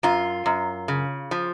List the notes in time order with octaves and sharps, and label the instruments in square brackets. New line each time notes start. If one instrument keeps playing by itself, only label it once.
[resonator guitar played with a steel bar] F#2 F4
F#2
C#3
F3